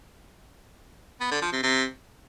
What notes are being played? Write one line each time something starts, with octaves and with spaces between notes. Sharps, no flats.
B3
D3
F3
C3
C3